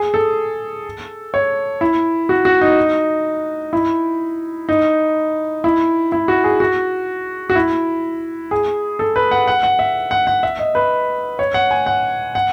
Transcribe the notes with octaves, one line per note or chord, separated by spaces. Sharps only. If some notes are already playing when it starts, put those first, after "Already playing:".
Already playing: G#4
A4
C#5
E4
F#4
F#4
D#4
E4
D#4
E4
E4
F#4
G#4
F#4
F#4
E4
G#4
A4
B4
F#5
F#5
F#5
E5
F#5
F#5
E5
D#5
B4
C#5
F#5
G#5
F#5
F#5